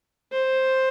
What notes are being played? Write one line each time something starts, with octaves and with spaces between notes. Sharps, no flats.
C5